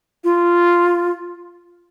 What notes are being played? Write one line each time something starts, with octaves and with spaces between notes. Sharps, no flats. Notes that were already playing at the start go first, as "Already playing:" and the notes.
F4